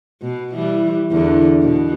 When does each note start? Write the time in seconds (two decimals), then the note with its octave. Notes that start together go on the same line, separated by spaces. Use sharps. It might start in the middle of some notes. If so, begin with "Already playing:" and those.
0.22 B2
0.55 E3 G3
1.11 E2 D3
1.62 B2